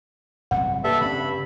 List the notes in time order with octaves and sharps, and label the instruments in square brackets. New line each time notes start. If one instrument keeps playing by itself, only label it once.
[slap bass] G2 C3 F#3 [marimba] F#5
[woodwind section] G2 [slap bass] A#3 [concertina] A4 E5
[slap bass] C#3 C4 [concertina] B5